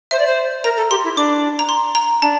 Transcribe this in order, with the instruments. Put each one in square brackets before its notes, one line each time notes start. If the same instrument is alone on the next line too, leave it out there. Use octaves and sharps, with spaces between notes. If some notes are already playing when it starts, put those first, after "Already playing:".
[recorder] C5 [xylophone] E5
[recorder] D5
C5
[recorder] A#4 [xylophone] A#5
[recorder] A4
[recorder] G4 [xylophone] C6
[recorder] E4
[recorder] D4 [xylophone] D6
[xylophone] A#5
C6
A#5
[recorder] D4 [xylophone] A5